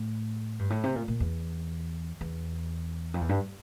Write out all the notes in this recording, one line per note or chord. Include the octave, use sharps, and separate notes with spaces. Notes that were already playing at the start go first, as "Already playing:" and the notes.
Already playing: A2
G2
A2
C3
A#2
A#2
E2
E2
F2
E2
G2